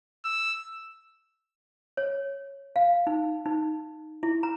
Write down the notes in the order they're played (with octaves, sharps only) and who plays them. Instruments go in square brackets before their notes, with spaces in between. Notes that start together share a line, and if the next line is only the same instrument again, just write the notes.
[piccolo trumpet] E6
[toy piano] C#5
F5
D#4
D#4
E4
A#5